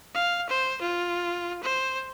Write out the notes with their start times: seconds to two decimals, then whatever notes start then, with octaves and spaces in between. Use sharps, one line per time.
0.14 F5
0.49 C5
0.81 F4
1.63 C5